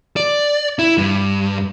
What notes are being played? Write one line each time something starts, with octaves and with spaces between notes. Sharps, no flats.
D5
E4
G2